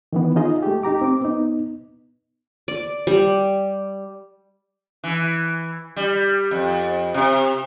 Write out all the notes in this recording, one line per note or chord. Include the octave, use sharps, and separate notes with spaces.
D#3 E3 B3
D#4 F4 G#4 D#5
A3 G4
D#4 G4 A#5 D6
C4 D6
B3 D#4
D5
G3
E3
G3
F2
C3